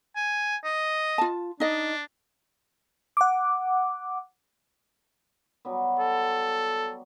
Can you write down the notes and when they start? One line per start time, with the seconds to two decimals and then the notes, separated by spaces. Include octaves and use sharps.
0.16 G#5
0.64 D#5
1.18 F4 A5
1.60 D4 D#4 D#5
3.17 F#5 D6
5.65 F#3 G3 B3
6.00 A4